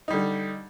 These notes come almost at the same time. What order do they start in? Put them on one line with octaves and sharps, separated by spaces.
D#4 G3 D3